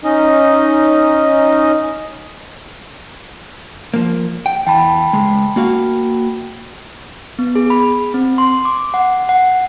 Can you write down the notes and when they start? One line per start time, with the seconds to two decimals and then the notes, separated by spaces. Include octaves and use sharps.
0.04 C#4 D#4 D#5
3.94 F3 A#3
4.46 G5
4.67 E2 G5 A5 B5
5.13 C#2 G#3
5.56 A#3 F#4 F5
7.39 B3
7.55 G#4
7.70 B5
8.14 C4
8.38 C6
8.65 D6
8.94 F#5
9.29 F#5